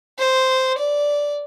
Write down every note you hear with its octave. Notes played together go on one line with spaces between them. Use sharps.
C5
D5